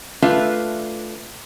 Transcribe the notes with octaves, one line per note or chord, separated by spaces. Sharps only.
A3 D4 F4 B4 E5 F5